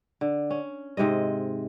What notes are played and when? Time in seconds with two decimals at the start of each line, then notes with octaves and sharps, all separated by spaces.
0.21 D3
0.50 C#4
0.97 G#2 C3 G#3 D#5